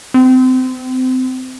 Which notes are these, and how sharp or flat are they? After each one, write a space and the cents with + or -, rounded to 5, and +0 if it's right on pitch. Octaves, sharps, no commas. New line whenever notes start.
C4 -30